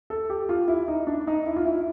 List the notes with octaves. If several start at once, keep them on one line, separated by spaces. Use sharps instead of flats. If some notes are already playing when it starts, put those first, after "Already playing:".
A4
G4
F4
E4
D#4
D4
D#4
E4
F4
E4